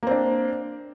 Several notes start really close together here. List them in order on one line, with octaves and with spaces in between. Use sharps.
A#3 C4 D4